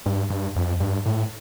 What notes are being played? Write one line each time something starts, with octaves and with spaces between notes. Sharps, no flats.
G2
G2
F2
G2
A2